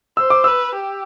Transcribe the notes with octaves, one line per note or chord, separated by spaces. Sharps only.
C5 E6
D6
B4 E6
G4